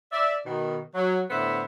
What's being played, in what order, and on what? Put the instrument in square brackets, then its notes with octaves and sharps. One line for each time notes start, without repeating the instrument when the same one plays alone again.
[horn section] D5 E5
B2 D#3
F#3
A2 D3 B3 C5 E5